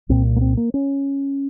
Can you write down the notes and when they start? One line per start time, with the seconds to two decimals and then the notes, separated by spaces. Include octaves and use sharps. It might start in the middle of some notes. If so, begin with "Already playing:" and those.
0.09 C2 A#2 C4
0.36 A#3
0.41 C4
0.57 A#3
0.74 C#4